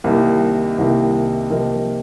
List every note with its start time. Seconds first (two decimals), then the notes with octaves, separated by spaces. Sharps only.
0.04 C2 C3 D#3 A#3
0.78 C2 C3 D#3 A#3
1.50 C3 F3 A#3 D#4 A#4